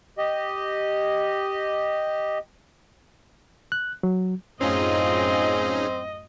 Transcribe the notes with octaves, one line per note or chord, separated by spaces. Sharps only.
G4 D#5
F#6
F#3
F#2 A2 C4 C#4 D#4 F4 G#4 D#5